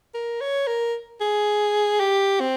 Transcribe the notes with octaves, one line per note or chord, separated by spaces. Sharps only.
A#4
C#5
A#4
G#4
G4
C4